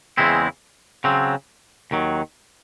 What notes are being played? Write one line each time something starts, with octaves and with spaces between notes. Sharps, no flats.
E2 C#3 G#3 C4 E4
C#3 F#3 C4
D#2 D#3 F#3